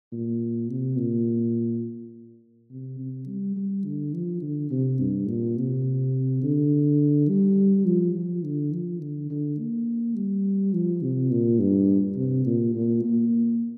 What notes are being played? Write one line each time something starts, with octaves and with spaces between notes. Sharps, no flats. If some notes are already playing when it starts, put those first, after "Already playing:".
A#2
C3
A#2
C3
C3
G3
G3
D3
F3
D3
C3
G2
A#2
C3
D3
G3
F3
F3
D3
F3
D3
D3
A#3
G3
F3
C3
A#2
G2
C3
A#2
A#2
A#3